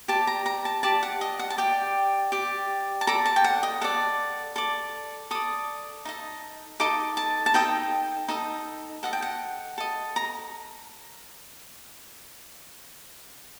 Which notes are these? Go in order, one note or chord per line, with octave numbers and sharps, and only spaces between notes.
G4 D5 A5
A#5
A#5
A5
G4 D5 A5
F#5
D#5
F#5
A5
G4 D5 G5
G4 D5
A5
A4 D5 A#5
A5
G5
F#5
D#5
A4 D5 F#5
A4 D5
A4 D5 D#6
D#4 A4 D#5
D#4 A4 D#5 D6
A5
A5
D#4 A4 D#5 G5
D#4 A4 D#5
A4 D#5 F#5
G5
F#5
A4 D#5
A#5